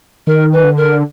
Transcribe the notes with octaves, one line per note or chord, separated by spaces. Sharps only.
D#3 A#4
B4
D3
A#4